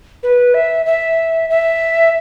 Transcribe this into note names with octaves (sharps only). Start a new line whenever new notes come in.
B4
E5
E5
E5